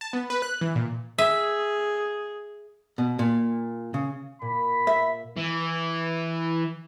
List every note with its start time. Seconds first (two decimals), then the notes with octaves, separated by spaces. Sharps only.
0.01 A5
0.13 B3
0.30 B4
0.42 F#6
0.61 E3
0.75 A#2
1.18 G#4 E5
2.98 B2
3.19 A#2
3.94 C#3
4.42 A#2 B5
4.87 E5
5.37 E3